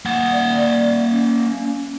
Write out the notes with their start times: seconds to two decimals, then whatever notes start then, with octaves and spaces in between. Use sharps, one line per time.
0.05 A#3 F#5
0.32 D5
1.08 C#4